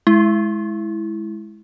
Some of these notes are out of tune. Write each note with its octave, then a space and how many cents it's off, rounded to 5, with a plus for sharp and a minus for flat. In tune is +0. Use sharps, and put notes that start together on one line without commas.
G#3 +15 E4 +0